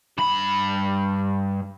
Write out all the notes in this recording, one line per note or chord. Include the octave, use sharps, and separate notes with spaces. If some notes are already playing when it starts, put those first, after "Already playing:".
G2 B5